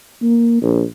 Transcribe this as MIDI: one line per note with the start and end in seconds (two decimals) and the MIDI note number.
0.22 0.61 58
0.62 0.82 34